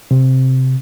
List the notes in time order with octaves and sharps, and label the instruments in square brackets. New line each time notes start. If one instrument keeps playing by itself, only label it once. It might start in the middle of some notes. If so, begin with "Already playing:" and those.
[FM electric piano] C3